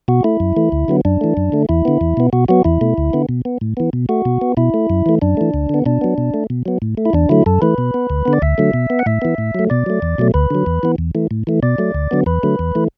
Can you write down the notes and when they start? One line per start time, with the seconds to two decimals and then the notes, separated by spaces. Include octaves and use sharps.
0.08 B2 F#4
0.24 A3 E4
0.40 F#2
0.57 E3 A3
0.72 D2
0.88 D3 F#3 B3
1.05 F#2 D4
1.21 E3 A3
1.37 F#2
1.52 D3 A3
1.69 E2 E4
1.85 D3 B3
2.01 E2
2.17 B2 B3
2.33 B2 F#4
2.48 F#3 B3 F#4
2.65 E2 E4
2.81 B2 A3
2.98 D2
3.13 D3 B3
3.29 B2
3.45 B3
3.61 A2
3.77 E3 B3
3.93 B2
4.09 A3 F#4
4.25 B2
4.41 B3
4.57 B2 E4
4.74 A3
4.90 F#2
5.06 E3 A3
5.22 F#2 D4
5.37 E3 A3
5.54 D2
5.69 D3 B3
5.86 B2 D4
6.01 F#3 B3
6.18 B2
6.34 A3
6.50 B2
6.66 F#3 B3
6.82 A2
6.97 A3
7.05 E4
7.13 E2 D4
7.29 D3 F#3 A3 E4
7.46 F#2 A4
7.62 E3 A3 B4
7.78 B2
7.94 B3
8.10 D2
8.25 D3 B3
8.33 D5
8.42 D2 E5
8.58 D3 F#3 A3
8.74 B2
8.90 B3
8.99 F#5
9.06 A2 E5
9.22 E3 B3
9.38 A2
9.55 F#3 A3
9.70 B2 D5
9.86 F#3 A3
10.02 E2
10.18 B2 F#3 A3
10.34 D2 B4
10.50 D3 F#3
10.66 E2
10.83 E3 B3
10.98 E2
11.15 E3 A3
11.31 A2
11.47 E3 A3
11.63 B2 D5
11.78 F#3 A3
11.95 D2
12.11 D3 F#3 B3
12.26 E2 B4
12.43 D3 F#3 A3
12.59 E2
12.75 E3 A3